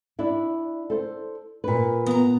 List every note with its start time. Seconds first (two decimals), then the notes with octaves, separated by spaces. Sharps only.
0.19 D4 E4
0.90 A4 C5
1.64 A#2 B4
2.06 B3 A#5